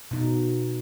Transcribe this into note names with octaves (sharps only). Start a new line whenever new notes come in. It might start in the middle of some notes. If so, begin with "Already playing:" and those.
B2 D#4